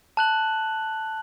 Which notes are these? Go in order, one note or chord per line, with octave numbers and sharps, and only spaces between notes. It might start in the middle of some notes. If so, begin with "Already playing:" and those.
A5 F#6 F#7